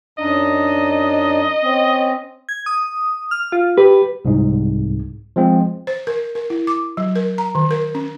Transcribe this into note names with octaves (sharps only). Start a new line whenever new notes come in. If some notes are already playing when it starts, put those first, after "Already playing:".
F#2 D4 D#4 D#5
C4 C#4
G#6
D#6
F6
F4
G4 B4
C2 G#2
F3 G#3 C4
C5
A#4
A#4
E4
D6
F#3
A#4
A#5
D#3
A#4
C#4